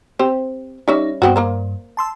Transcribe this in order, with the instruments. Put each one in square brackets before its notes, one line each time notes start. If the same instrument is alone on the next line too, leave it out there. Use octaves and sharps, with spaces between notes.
[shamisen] C4 G4 C5
[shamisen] G3 C#4 E5 [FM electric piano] D#4
[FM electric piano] G2 [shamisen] B3 C4 F#4
[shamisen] A#3 A#4 C5
[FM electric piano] A5 C6 E6